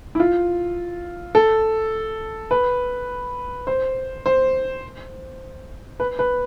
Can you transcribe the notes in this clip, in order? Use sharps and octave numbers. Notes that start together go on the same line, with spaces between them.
E4
F4
A4
B4
C5
C5
B4
B4